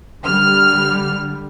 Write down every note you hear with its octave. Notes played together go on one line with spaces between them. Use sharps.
D3 G3 F6